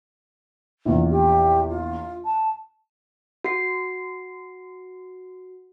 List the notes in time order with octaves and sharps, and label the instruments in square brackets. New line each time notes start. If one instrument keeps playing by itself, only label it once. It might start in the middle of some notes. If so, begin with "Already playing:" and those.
[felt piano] A#1 E2
[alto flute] G4
F4
A5
[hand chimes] F#4 C7